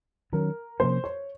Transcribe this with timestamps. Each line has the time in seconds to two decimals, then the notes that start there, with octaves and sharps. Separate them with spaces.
0.32 D#3 F#3 C#4 A#4
0.80 C3 F3 A#3 C#4 C5
1.04 C#5